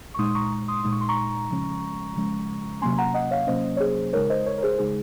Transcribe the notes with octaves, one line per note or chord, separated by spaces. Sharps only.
C#6
A#2 G#3 D#4 C6 D#6
A#5 C#6
C6 D#6
A#2 G#3 D#4 D#6
C#6
C6
A#5 C#6
C#3 F3 G#3 C#4
C#3 F3 G#3 C#4
C3 F#3 A#3 C#4 G#5 C6
F#5 A#5
D#5 F#5
C#5 F5
C3 F#3 A#3 C#4 C5 D#5
C#5
G#4 C5
C#3 G#3 D#4 A#4 C#5
C5 D#5
A#4 C#5
A#4
G#4 C5
C#3 G#3 D#4 G#4